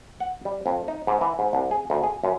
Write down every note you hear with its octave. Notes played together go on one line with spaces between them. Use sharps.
F#5
G3
F2
D#4
G#2
E3
G#2
C2
G#4
D2
G#4
F#2